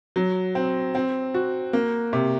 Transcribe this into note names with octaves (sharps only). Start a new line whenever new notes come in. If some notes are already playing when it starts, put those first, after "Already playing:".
F#3
C4
C4
F#4
A#3
C3